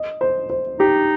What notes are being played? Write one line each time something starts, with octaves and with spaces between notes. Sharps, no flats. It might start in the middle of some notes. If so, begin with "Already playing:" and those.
Already playing: D#5
C5
C5
D#4 G4